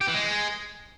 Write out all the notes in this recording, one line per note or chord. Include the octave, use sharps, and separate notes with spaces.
G4
E3
G#3